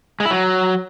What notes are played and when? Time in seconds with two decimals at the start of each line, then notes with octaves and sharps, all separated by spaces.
0.20 G#3
0.25 E4
0.31 F#3